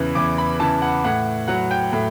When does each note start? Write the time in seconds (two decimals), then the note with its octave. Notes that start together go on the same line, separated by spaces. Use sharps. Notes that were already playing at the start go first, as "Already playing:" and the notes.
Already playing: E2 C#3 E3
0.15 E2 D6
0.38 B5
0.60 C#3 E3 A5
0.82 F#5
1.04 A2 F#5
1.48 F#3 F#5
1.71 G5
1.93 A2